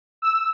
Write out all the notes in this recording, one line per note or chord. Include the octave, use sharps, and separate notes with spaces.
E6